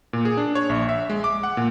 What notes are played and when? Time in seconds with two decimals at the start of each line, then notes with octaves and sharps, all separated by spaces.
0.13 A#2
0.25 G#4
0.37 D4
0.55 C#5
0.69 A#1
0.89 E5
1.10 G#3
1.24 D6
1.43 F#5
1.57 A#2